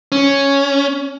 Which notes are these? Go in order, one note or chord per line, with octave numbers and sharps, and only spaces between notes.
C#4